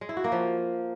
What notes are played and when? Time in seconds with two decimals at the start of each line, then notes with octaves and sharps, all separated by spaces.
0.01 G#3
0.09 E4
0.17 F#4
0.24 A#3
0.32 F3